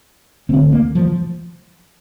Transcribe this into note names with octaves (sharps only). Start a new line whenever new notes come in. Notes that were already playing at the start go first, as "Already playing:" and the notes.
D2 D3 C4
A#3
F3